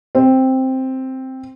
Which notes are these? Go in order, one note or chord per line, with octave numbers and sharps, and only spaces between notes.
C4